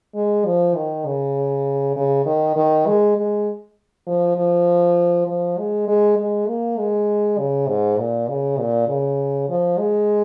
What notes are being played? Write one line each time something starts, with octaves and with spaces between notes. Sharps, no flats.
G#3
F3
D#3
C#3
C#3
D#3
D#3
G#3
G#3
F3
F3
F3
G#3
G#3
G#3
A#3
G#3
C#3
G#2
A#2
C#3
A#2
C#3
F3
G#3